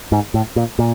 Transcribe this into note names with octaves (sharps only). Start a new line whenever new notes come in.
G#2
A2
A#2
A#2